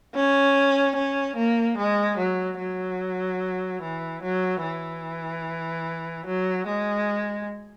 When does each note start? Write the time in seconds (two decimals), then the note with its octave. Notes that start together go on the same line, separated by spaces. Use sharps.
0.15 C#4
0.95 C#4
1.36 A#3
1.77 G#3
2.18 F#3
2.58 F#3
3.82 E3
4.22 F#3
4.63 E3
6.26 F#3
6.66 G#3